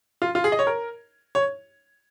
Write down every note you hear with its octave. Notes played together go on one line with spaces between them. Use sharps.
F4
F4
G#4
D#5
C#5
A#4
C#5